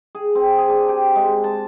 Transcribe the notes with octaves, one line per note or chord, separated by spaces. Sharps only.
G#4
C4
G#4
D4
G4
G#3
A5